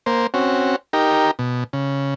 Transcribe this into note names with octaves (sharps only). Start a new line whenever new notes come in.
A#3 C5
C4 C#4 F#4
D#4 G4 A#4
B2
C#3